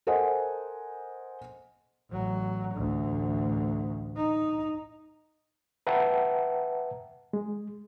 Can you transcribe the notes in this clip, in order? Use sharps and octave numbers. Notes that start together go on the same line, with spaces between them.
A4 A#4 C5 D#5 F#5 G#5
A1 F#3
A1 D2
D#4
B4 E5 F#5 G5 A5 A#5
G#3